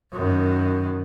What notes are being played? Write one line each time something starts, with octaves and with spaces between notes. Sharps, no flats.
F#2 D#3